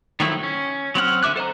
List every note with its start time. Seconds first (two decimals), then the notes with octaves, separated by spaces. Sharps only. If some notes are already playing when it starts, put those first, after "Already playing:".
0.20 D#3 F3 F#3 A3 E4
0.43 C#4
0.95 F#3 C4 F#5 F6
1.23 D3 A#4 E5 D6 F#6
1.36 A4 C5 D#5 A#5